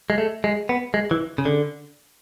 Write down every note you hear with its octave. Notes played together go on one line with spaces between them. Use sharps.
G#3
A3
G#3
B3
G#3
E3
C#3
D3